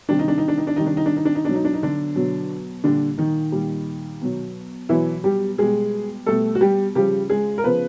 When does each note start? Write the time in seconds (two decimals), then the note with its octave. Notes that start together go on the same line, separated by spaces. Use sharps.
0.09 C3 D#3 G3 D4
0.19 D#4
0.28 D4
0.38 D#4
0.48 D4
0.58 D#4
0.67 D4
0.76 C3 D#3 G3 D#4
0.86 D4
0.97 D#4
1.06 D4
1.16 D#4
1.25 D4
1.35 D#4
1.45 B2 F#3 D4
1.55 D#4
1.65 D4
1.74 D#4
1.83 D3 D4
2.16 B2 F#3
2.84 A#2 D3 G3 D4
3.18 D#3 D#4
3.52 A#2 G3
4.21 B2 F#3
4.89 B2 E3 F#3 E4
5.24 G3 G4
5.58 B2 G3 G#3 G#4
6.26 B2 G3 A3 A4
6.55 F#4
6.61 G3 G4
6.95 C#3 F3 G3 G4
7.30 G#3 G#4
7.58 A#4
7.64 C#3 F3 B3 B4